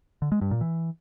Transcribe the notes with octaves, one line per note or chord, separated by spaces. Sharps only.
D3
G#3
G2
A#2
E3